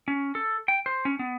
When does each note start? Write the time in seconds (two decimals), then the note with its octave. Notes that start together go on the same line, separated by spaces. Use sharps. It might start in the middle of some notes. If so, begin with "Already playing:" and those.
0.08 C#4
0.35 A4
0.68 G5
0.86 C5
1.05 C#4
1.19 B3